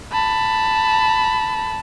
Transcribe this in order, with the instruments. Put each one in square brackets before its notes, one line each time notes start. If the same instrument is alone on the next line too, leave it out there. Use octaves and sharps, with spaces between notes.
[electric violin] A5 B5